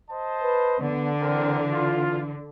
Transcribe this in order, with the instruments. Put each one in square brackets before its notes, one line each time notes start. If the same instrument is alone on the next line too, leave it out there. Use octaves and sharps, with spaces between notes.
[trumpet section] C5 D#5 A5
[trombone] B4
[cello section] D3 [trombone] B3
[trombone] E3 [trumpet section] C4 A#4
[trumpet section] F4